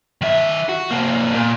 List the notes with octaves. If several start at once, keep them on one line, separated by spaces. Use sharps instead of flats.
D#3 E5
F#4
C3 A#3
A#2